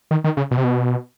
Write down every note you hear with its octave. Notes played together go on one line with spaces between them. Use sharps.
D#3
D#3
C#3
B2
C3
B2